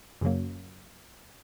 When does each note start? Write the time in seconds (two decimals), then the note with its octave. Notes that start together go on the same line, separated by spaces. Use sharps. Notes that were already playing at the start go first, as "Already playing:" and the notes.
0.21 F#2 C#3 F#3 A#3